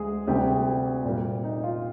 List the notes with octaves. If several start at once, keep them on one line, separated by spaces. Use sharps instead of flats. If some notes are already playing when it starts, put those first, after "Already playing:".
Already playing: D2 G#3 G#4
D2 C3 G3 G4
G#4
G4
A#2 G3 A#3
D#4
F4